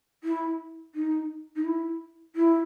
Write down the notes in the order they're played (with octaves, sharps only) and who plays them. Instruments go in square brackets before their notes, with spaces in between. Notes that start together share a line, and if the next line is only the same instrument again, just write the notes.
[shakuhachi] E4
D#4
D#4
E4
E4